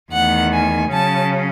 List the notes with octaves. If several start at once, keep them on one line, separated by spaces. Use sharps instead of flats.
E2 D#3 A3 F#5
G#5
C#3 F#3 C#4 A5